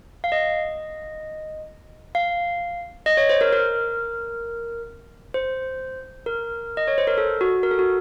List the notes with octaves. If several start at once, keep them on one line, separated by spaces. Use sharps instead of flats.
F5
D#5
F5
D#5
C#5
C5
A#4
A#4
C5
A#4
D#5
C#5
C5
A#4
A4
F#4
A#4
A4
F#4